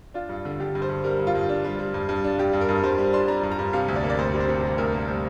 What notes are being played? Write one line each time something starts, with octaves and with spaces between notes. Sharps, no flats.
D4 F4
G2
D3
D3 G4
G2
C5
G2
G3 A#4
G2
F4
G2
D4
G3
G3
G2
G2
D4
G2 G4
G2
A#4
G2
G2 C5
G3
D4 C6
G3 A#5
G2
A#5
G2
C3 F5
D2
D5
A#3
D5
D2 C5
C3
C5
C3
G3
D2 A#4
A#3
G3 C5